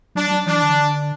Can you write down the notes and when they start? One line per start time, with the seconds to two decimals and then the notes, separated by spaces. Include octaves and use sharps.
0.15 F#3 D4
0.31 F#3
0.46 E3 D4
0.63 D3